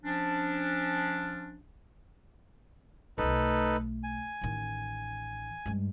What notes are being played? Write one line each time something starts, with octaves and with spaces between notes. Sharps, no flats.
F3 C#4 D4
B1 A3 D#4 A4 B4
G#5
A1 D#3
G2 G#3